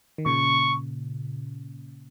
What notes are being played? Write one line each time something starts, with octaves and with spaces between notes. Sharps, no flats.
D#3
A#2 C#3 C#6